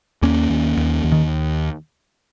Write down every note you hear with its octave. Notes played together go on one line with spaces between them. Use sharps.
D#2 A#3 C#4
D#2
D#2
D#2
D#3